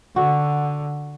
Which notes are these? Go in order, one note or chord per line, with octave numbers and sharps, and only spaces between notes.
D3 F#4